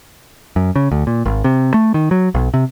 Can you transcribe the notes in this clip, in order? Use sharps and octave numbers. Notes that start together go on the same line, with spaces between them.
F#2
C#3
D2
A#2
G#1
C3
A3
D#3
F#3
B1
C3